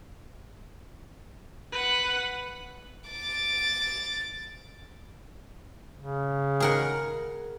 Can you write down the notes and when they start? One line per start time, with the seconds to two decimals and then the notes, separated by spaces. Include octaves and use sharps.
1.72 B4 F#5
3.10 D6 A6
5.98 C#3
6.60 G#4 A#4 F#5